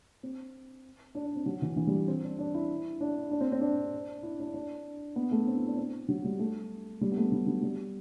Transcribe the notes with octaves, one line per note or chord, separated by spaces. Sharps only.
C4
D4
D4
C4
F#3
E3
E3
G3
C4
D4
D4
E4
D4
D4
C4
C4
D4
E4
D4
D4
B3
A3
C4
E4
D4
C4
F#3
G3
A3
G3
B3
A3
F#3
F#3
G3